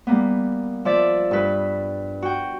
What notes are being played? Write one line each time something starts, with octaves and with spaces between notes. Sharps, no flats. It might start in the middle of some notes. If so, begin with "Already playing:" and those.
G3 A#3 B3
F3 D5 E5
G2 B4
F#4 G5